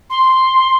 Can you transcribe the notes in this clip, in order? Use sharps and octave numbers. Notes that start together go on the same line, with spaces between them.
C6